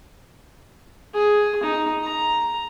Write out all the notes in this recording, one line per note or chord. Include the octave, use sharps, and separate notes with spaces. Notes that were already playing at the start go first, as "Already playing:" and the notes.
G#4
D#4
A#5